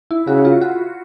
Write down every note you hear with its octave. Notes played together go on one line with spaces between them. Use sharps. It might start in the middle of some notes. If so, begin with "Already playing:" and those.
E4
C#3 F#4
F4
F#4